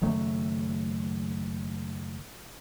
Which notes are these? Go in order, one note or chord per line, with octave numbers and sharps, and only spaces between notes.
F#1 D#3 F#3 A3